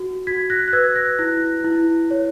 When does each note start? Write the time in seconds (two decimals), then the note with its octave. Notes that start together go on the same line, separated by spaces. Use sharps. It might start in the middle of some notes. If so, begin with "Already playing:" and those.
Already playing: F#4
0.27 F#4 G#6 B6
0.50 F#6 A#6
0.68 F#6
0.73 B4 E6 G#6
0.96 F#6 A#6
1.19 E4 F#6 A#6
1.64 E4
2.11 C#5